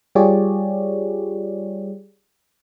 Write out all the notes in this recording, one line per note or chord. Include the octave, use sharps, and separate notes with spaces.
G3 F4 G4 G#4 C#5 D5